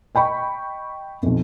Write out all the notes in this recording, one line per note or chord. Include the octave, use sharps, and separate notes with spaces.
D#5 G5 B5 C#6
B1 F2